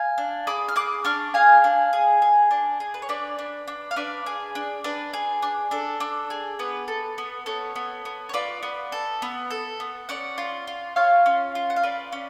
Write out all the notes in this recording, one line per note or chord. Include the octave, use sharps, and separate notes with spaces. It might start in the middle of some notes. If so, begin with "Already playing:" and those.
Already playing: F5 G#5
D4
G#4 B5 D6
F6
G#4 D6 F#6
D4 C#6 F6
G#4 F5 G#5
D4
G#4
G#4
D4
G#4
B4
C#5
D4 B4 D5
D4
D4
F5
D4 B4 D5
G#4
D4
D4 B4
G#4
D4
D4 A4
D4
G#4
B3 B4
A4
B3
B3 A4 C#5
B3
B3
C#5
F4 B4 D5
B3
A4
B3
A4
B3
C#4 D5 F#5
F4
F4
F4 C#5 F5
C#4
F4
F#5
F5
F4 B4 D5
C#4